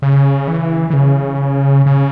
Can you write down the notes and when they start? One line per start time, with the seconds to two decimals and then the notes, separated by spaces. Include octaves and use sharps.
0.02 C#3
0.48 E3
0.90 E3
0.93 C#3
1.86 C#3